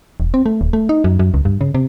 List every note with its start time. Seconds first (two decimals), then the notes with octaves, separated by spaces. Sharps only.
0.20 E1
0.34 C4
0.46 A3
0.61 D1
0.73 A3
0.89 D#4
1.04 F#2
1.19 F#2
1.34 C#2
1.45 G2
1.61 C#3
1.74 C3